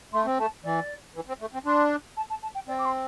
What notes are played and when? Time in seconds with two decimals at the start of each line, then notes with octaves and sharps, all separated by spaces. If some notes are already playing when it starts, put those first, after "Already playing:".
0.13 A3 C6
0.25 C4
0.39 A3 A5
0.64 E3 D5
1.15 E3
1.28 C4
1.41 A3
1.54 C4
1.65 D4 C6
2.17 A5
2.30 A5
2.43 A5
2.55 G5
2.68 C4 D5
2.79 D6
2.85 C6